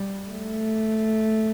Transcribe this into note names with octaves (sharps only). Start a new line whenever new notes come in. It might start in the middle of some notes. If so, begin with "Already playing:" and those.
Already playing: G3
A3